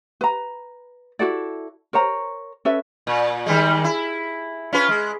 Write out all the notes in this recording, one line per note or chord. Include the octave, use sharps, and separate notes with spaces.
B4 A#5
E4 F#4 A4 D5
A#4 C5 C#5 A#5
C#4 A4 B4 E5
A#2
D#3 G3 G#3
E4
C#4 F4 B4
G#3